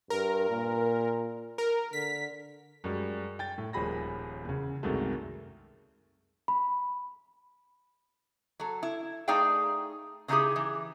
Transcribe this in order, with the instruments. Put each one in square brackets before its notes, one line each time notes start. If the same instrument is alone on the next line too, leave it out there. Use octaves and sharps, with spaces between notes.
[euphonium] G2 [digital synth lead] A#4
[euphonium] A#2
[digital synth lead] A#4
[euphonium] D3 [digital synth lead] B6
[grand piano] F#2 G3 G#3
G5 A6
A2
D#1 D#2 F3 G#4 B5 A#6
E2 C#3
C2 F#2 D#3 F#3 G#3 A3
[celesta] B5
[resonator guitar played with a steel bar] F#3 A4
E4
A3 D#4 G#4 D5 F5 G5
C#3 E3 D#4 E4 G4 G#4
E3